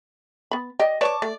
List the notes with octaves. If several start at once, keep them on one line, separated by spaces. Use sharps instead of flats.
B3 B5
G4 D5 D#5
B4 C#5 D5 A5 C#6 D6
A3 D5